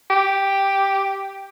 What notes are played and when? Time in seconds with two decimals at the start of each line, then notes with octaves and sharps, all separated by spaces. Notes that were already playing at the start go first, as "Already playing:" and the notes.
0.10 G4